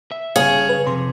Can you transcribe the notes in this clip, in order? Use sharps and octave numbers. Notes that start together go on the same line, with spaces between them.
E5
G2 C#3 G#4 C#5 F5
B4
F2 C3 C6